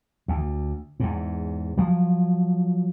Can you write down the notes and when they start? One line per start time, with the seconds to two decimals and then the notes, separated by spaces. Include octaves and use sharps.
0.28 D2
1.00 E2 G#2
1.77 F3 F#3